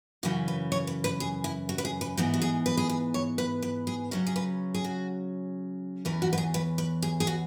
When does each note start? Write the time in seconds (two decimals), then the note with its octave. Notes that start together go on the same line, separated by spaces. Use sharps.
0.23 F#2 C#3 E3 C#4 F#4
0.48 B4
0.72 C#5
0.87 B4
1.04 B4
1.20 G#4
1.44 E4
1.69 F#4
1.78 B4
1.85 G#4
2.01 B4
2.17 G#2 E3 B3 F#4
2.34 F#4
2.42 G#4
2.66 B4
2.77 G#4
2.89 B4
3.14 C#5
3.38 B4
3.62 B4
3.87 G#4
4.11 C#3 F#3 C#4 F#4
4.27 G#4
4.36 B4
4.74 G#4
4.84 F#4
6.05 E2 E3 C#4 B4
6.22 F#4
6.33 B4
6.38 G#4
6.54 B4
6.78 B4
7.02 G#4
7.20 G#4
7.27 F#4